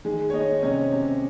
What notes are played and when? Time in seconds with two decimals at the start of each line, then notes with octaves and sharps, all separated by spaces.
0.05 D#3 G#3 G#4
0.30 C#5
0.33 G#3 D#4 D#5
0.62 C3 C#4 C#5
0.92 C3